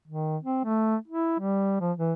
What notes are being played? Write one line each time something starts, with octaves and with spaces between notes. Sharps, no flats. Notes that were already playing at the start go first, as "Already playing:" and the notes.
D#3
C4
A3
E4
G3
F3
E3